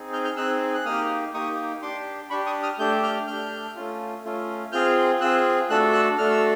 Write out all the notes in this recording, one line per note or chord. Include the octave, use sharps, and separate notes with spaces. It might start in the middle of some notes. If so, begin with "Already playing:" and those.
Already playing: C4 D#4 G#4
F6 G6
F6 G6
C4 D#4 G#4 E6 F#6
F#6
A#3 D#4 G4 D#6 F6
A#3 D#4 G4 C#6 D#6
D4 G4 C6 D6
D4 G4 B5 C#6
C#6 D#6
D#6 F6
A3 D4 G4 G6
F6 G6
A3 D4 G4 F6 G6
A3 C#4 F4
A3 C#4 F4
C4 F4 G#4 F6 G6
C4 F4 G#4 E6 F#6
A3 D4 F#4 A4 E6 F#6
E6 F#6
A3 D4 F#4 A4 F6
E6